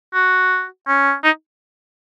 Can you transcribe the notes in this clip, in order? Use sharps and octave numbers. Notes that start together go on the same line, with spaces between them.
F#4
C#4
D#4